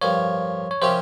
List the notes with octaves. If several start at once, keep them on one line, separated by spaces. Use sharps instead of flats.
G2 F3 A#3 C#5
C#5
C3 F3 A#3 C#4 G4 C5